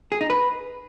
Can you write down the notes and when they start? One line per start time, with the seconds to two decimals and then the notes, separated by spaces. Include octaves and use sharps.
0.12 G#4
0.21 D#4
0.30 B4